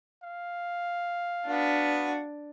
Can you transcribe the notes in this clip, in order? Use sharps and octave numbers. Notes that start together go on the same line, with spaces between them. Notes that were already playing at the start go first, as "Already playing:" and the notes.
F5
B3 D4 F#4